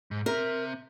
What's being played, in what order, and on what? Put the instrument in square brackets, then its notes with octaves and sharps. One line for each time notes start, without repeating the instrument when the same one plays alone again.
[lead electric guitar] G#2
[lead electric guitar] C4 E5 [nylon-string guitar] A#4